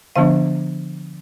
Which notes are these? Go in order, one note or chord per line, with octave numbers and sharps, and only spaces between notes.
D3 F3 B3 D4 F5